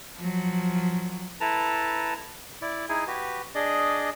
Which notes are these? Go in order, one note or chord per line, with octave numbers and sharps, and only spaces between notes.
F3 F#3
E4 A4 B4 A5 A#5
E4 D5
D#4 E4 G#4 G#5
F#4 G4 B4
D4 G#4 D5 D#5